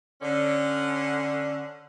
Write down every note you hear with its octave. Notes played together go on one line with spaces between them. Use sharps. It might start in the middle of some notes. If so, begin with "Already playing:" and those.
D3 C#4